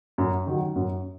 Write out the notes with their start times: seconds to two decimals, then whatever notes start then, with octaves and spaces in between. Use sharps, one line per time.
0.18 F#2
0.47 D#3 F#3
0.76 F#2